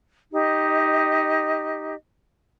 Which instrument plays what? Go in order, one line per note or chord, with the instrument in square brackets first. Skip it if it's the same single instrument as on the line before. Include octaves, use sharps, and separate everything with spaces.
[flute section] D#4 G4 D#5